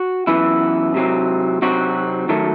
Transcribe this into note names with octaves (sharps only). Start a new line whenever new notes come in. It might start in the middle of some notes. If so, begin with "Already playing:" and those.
Already playing: F#4
F#2 E3 B3 E4
C3 F#3 C4 D#4
C3 F#3 C4 D#4 F#4
D#3 F#3 A3